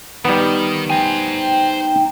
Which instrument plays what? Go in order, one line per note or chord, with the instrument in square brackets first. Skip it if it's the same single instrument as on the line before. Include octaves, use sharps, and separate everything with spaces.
[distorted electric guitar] D#3 [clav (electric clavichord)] G3 B3 [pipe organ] D#4
[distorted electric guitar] C5 G#5 [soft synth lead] G5